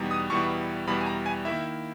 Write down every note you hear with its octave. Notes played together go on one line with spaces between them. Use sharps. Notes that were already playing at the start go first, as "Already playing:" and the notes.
Already playing: E2 B2 G3 B3 D#4
D#6
E2 B2 G3 B3 E4 C#6
E2 B2 G3 B3 E4 B5
G#5
A#5
G#5
D#3 A#3 E4 E5